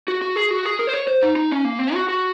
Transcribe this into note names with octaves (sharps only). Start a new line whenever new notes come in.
F#4
F#4
G#4
F#4
G#4
A#4
C5
C#5
C5
D#4
D#4
C#4
A#3
C4
F#4
F#4